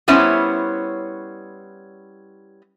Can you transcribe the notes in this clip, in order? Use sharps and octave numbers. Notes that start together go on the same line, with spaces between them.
G3 B3 C#4 E4 C5 C#5